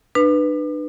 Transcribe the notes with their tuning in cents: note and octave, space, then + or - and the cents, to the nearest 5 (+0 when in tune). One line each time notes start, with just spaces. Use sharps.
D4 +40 B4 +0